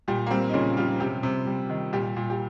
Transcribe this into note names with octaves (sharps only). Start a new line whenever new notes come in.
A#2 G3 G4
A#3
G3 C4
D#4
A#2 C#3 C#4
F3 G3 F4
C3 G3 G4
C3
G3
D#3
A#2 G3 G4
A#2
G4